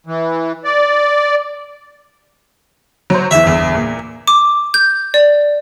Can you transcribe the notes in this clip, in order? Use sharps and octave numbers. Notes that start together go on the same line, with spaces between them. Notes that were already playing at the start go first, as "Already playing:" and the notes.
E3
D5
F#3 C5
E2 E3 E5
G1 E2
A#2
D6
G6
D5